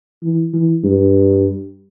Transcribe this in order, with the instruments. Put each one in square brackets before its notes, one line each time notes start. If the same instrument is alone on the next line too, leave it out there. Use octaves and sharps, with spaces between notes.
[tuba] E3
E3
G2